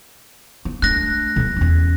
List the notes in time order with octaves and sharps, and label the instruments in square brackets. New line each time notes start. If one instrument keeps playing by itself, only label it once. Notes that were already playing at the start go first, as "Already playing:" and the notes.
[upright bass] B3
[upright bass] A3 D4 [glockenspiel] F#6 A#6
[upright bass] D#3 E3
E2 C#4